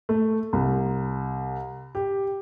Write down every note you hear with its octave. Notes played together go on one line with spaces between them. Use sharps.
A3
C2
G4